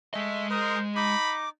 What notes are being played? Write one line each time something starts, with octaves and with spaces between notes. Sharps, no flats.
G#3 A3 D#5 E5
A#4 C5 D#6
D#4 B5 D6